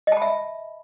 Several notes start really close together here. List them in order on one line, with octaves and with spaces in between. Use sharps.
D#5 A5 B5 E5